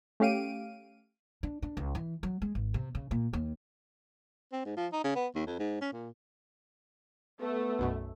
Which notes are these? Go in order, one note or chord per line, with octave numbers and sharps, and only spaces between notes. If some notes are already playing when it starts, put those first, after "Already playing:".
A3 C#4 G4 F5 D7 D#7
D4
D4
C#2
E3
F#3
G#3
G#1
C3
C#3
A#2
D#2
C4
G#2
F3
D#4
C#3
B3
D#2
F2
G#2
C#4
A#2
A3 B3
B1 F#2 B2